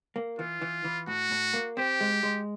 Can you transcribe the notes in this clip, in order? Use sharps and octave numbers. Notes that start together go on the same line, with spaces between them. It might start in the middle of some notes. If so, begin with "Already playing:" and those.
A#3
E3 F4
E3
E3
A2 F#4
A2
A#3
C4 G4
G#3
G#3